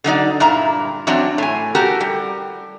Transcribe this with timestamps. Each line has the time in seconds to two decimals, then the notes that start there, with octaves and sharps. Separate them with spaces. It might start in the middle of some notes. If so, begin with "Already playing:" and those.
0.04 D3 F#3 D#4 D5
0.40 G2 A#2 E4 A#5
1.07 E3 F#3 C4 D4
1.38 A2 G#5
1.75 F#4 G4 A4 A#4
2.00 G3